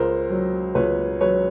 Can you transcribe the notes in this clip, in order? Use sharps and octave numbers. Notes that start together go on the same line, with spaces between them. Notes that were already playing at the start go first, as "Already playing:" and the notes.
Already playing: C#2 A#4 C5
F#3
C#2 B4 C#5
F#3 B4 C#5